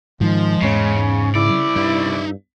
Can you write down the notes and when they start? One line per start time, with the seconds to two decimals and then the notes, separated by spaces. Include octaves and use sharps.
0.21 G#2 D#3 F3 G#3
0.62 E2 G#2 C#3 C#4
1.35 C2 C#3 E4 D5
1.76 G2 D#4 E5